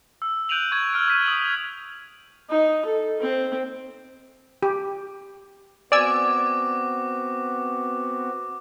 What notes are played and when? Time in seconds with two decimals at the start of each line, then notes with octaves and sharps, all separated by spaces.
0.22 E6
0.49 F#6 G6 D7 D#7 F7 F#7
0.72 C#6 G#6
0.94 E6 F6 D7
1.08 C#6 B6 D#7
1.26 D#6 F#7
2.50 D#4
2.85 A4
3.20 C4
4.63 G4
5.92 B3 C4 F#4 D5 G#5 D6 E6